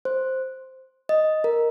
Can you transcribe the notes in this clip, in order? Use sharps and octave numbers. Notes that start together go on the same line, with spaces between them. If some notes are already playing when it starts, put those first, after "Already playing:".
C5
D#5
A#4